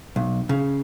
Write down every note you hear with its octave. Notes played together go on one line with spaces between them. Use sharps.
B1
C#3